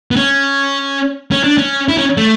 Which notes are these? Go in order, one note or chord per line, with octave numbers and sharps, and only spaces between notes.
B3
C#4
C#4
D4
C#4
E4
C#4
A3